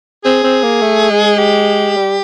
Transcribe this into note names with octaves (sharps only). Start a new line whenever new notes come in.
C4 G#4
C4
A#3
A3
G#3
G4
G3